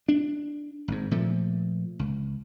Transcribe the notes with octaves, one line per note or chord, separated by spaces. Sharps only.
D4
G#1 G#2
A#2 F3 A3
C#2